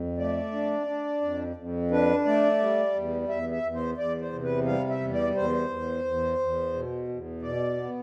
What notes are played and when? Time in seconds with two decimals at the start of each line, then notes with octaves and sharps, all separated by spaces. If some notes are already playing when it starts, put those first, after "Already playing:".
Already playing: F2
0.18 A3 D5
0.52 D4
0.87 D4
1.21 F2
1.56 F2
1.91 D4 B4
2.25 A3 D5
2.60 G3
2.94 E2
3.29 E2 E5
3.51 E5
3.63 E2
3.74 C5
3.97 E2 D5
4.21 C5
4.32 C3
4.43 B4
4.66 G3 F5
4.89 E5
5.01 E2
5.13 D5
5.35 E2 C5
5.70 E2
6.04 E2
6.39 E2
6.74 B2
7.08 E2
7.42 B2 D5
7.77 B3